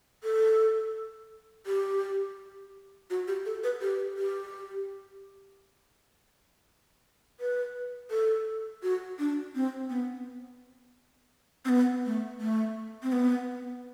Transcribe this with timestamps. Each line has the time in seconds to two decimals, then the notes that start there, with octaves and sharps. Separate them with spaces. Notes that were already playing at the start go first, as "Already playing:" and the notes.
0.24 A4
1.66 G4
3.10 F#4
3.28 G4
3.46 A4
3.64 B4
3.81 G4
4.17 G4
7.40 B4
8.11 A4
8.83 F#4
9.19 D4
9.55 C4
9.90 B3
11.65 C4
11.69 B3
12.06 A3
12.41 A3
13.03 C4
13.12 B3